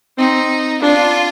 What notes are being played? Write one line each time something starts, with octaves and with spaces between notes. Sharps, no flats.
C4 D#4
D4 F4